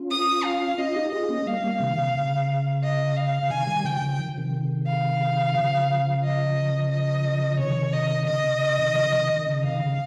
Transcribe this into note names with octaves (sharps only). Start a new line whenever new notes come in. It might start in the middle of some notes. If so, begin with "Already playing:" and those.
Already playing: C#4 F4
D#6
F5
C#4 F4 D#5
D#4 G4
F4 G#4 D#5
A#3 C#4
G3 A#3 F5
G3 A#3
C3 D#3
C3
C#3
D#5
F5
C#3
C3 D#3 G#5
D#3 G3
C#3 F3 G5
C#3 F3
D#3
F3
C3 D#3
F5
C#3 F3
D#5
D#5
C3 D#3 C#5
D#5
C#3 D#5
C3
C#3
C3 D#3
C#3 F3
C3 D#3
D#3
C#3
C3 D#3 F5
C#3